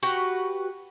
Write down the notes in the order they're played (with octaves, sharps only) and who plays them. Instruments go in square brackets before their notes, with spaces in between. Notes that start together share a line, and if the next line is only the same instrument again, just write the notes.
[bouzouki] F#4 G4 B4 F#5